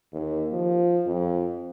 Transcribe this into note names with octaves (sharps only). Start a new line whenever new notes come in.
D#2
F3
F2